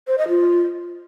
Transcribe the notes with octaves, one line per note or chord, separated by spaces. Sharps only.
C5
D#5
F4